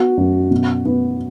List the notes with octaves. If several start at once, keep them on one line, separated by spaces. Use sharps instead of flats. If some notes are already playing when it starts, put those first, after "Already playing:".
Already playing: B3 F#4
F#2
B2
B3